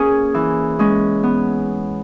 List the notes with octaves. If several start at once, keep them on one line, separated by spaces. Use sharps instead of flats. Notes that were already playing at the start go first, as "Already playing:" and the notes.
Already playing: A#3 C#4 G#4
E3
G#3 C#4
B3